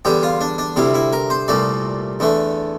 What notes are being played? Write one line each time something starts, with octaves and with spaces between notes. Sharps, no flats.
E2 D3 G3 G4
F4
D4
D4
D2 C3 G3 E4
E4
A#4
C5
C2 A#2 A3 D5
E2 D3 A3